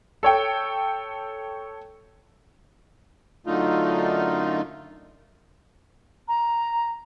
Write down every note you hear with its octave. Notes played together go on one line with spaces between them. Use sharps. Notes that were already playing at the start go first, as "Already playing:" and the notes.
A4 C#5 G5
F#2 D3 A3 D#4 F4
A#5